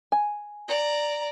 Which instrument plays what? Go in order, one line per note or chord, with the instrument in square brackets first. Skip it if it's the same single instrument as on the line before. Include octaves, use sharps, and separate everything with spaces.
[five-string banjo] G#5
[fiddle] D5 A#5